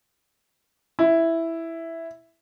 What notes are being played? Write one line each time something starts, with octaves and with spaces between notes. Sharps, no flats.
E4